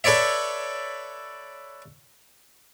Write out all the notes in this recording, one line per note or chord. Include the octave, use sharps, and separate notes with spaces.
A4 B4 C#5 D5 E5